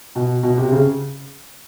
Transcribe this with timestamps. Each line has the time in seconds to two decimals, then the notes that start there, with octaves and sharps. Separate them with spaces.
0.15 B2
0.43 B2
0.58 C3
0.72 C#3